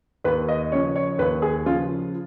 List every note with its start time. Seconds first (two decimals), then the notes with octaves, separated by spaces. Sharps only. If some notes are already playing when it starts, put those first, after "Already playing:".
0.24 D#2 B4
0.48 D#5
0.72 C#3 C#5
0.75 F3
0.96 C#5
1.18 D#2 B4
1.42 G#4
1.66 C#3 F3 F4